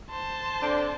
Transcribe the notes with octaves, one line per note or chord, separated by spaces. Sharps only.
C5 A5
D3 C4 D4